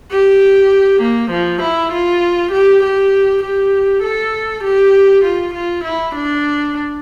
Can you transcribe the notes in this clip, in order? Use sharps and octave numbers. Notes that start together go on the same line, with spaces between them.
G4
A#3
F3
E4
F4
G4
G4
G4
A4
G4
F4
F4
E4
D4